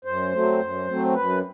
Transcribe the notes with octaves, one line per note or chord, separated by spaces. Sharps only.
F#2 C5
F#3 A3 C4
F#2
F#3 A3 C4
F#2 B4